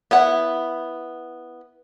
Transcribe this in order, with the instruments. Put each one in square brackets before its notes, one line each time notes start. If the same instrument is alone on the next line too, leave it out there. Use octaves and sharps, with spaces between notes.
[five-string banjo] B3 E4 F#5